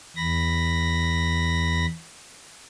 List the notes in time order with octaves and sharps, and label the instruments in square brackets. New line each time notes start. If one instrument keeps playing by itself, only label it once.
[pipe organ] E2 B5 A#6